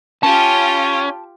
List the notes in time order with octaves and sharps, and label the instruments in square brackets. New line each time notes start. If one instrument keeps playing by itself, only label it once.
[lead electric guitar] C#4 [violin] F4 G4 [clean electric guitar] A5